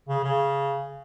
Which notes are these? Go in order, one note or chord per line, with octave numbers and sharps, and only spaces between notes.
C#3
C#3